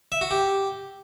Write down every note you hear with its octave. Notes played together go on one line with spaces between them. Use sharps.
E5
F#4
G4